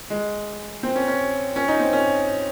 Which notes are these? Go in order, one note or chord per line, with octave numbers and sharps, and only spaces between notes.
G#3
C4
C#4
C#4
C#4
D#4
C4
C#4